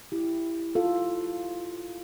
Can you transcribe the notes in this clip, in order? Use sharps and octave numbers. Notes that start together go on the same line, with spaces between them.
E4 G4
F4 A4